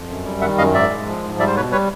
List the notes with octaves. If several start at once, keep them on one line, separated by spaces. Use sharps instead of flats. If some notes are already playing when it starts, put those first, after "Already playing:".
Already playing: F2
F#2
G3
D#3 E5 F#5
F#2 D#5 F5
G#2 D5 E5
G#3
F3
G#2
G3 D5 E5
C5
B2 B4 C#5
G3 B4 C#5